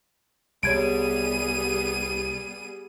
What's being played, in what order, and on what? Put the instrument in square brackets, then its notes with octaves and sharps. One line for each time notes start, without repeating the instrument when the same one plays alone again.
[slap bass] C2 [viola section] G3 B3 G#4 [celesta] C#5 G#6 D7 [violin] D#7